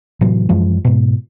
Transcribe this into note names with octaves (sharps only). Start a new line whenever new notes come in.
A2 C3 E3 F#3
F#2 E3 F3 G#3
G#2 B2